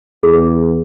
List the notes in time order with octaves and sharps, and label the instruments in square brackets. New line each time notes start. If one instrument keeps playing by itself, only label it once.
[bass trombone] E2 [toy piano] G#4